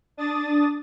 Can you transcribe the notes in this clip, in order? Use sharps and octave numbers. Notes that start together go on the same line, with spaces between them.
D4 D#6 A6